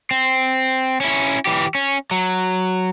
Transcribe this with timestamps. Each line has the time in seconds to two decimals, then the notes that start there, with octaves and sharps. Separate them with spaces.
0.11 C4
1.00 C#4 E4
1.45 E3 G4
1.75 C#4
2.11 F#3